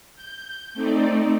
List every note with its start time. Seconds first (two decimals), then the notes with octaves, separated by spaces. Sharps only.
0.15 G6
0.74 A3 C4 D#4 D5